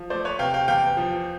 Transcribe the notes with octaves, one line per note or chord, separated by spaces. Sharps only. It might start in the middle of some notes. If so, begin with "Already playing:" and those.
Already playing: F3
A3 C5 D5
B4 C#5
C3 F5 G5
F5 G5
E2 F5 G5
F3